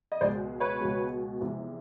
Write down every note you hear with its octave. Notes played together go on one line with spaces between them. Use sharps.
D#5
C#2 B2 G#3 C5 D5
B4 C#5
C#2 B2 G#3
E2 C3 F3 G#3